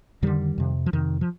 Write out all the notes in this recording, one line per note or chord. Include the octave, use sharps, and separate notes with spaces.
F2 D3 D#3 G3
F2 C3
F3
F2 C3 D#3
F3